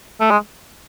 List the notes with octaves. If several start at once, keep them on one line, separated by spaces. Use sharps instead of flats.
A3
G#3